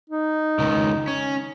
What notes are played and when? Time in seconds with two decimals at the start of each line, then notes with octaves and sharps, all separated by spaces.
0.10 D#4
0.59 C#2 D#3
1.08 C#4